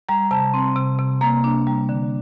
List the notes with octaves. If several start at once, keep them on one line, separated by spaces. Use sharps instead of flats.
G3 A#5
C3 A5
C4
C3
C3
A#3 A#5
D4
G3
D3